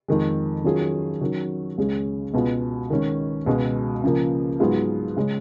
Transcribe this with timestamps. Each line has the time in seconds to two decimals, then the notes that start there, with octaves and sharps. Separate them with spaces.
0.08 F2 D#3 G#3
0.64 D#3 F#3 C#4 F4 G#4
1.21 D#3 F#3 C#4 F#4
1.78 C#2 C#3 G#3 C#4 G#4
2.34 C#2 B2 G#3 B3 F4
2.90 D#3 G#3 C#4
3.46 C#2 B2 G#3
4.04 C#3 F3 A#3
4.60 G#2 F#3 B3 F4 G#4
5.17 C#3 G#3 C#4